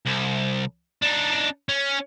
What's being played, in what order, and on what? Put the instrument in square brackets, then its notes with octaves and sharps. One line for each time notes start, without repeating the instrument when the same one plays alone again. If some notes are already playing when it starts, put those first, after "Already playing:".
[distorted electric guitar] C2
D4 D#4
C#4